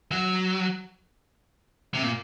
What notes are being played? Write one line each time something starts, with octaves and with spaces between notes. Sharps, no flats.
F#3
C3
A#2